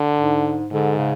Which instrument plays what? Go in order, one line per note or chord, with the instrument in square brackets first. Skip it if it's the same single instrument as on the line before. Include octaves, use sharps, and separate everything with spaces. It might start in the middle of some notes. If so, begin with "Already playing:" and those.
Already playing: [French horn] D3
[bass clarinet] G#2
[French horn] G#2 [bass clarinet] D3
[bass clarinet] C#3